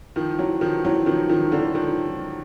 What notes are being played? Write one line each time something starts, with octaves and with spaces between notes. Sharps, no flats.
D#3 F3
E3 F#3
D#3 F3
E3 F#3
D#3 F3
D#3 F3
D3 E3
D#3 F3